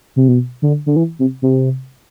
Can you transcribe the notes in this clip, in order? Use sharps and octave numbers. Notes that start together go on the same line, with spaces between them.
C3
B2
D3
D3
E3
C3
C3